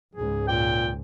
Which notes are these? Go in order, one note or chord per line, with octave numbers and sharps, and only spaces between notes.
C#2 G#2 G#4
A#2 G5